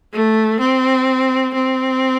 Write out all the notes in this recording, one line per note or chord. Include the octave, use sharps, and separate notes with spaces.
A3
C4
C4